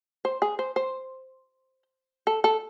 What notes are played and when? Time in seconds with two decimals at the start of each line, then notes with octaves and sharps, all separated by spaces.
0.25 C5
0.42 G#4
0.59 C5
0.76 C5
2.27 A4
2.44 A4